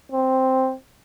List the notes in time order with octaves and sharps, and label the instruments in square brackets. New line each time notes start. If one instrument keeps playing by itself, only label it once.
[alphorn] C4